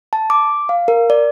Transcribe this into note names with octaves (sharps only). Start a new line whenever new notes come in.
A5
D6
F5
A#4
D5